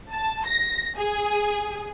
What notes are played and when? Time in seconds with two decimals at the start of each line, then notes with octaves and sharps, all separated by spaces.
0.12 A5
0.45 A#6
0.98 G#4